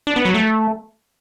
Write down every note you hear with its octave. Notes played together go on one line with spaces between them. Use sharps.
D4
B3
F#3
A3